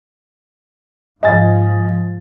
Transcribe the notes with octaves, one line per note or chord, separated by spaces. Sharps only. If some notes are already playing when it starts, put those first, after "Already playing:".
G#2 F3 D#5 G#5 A6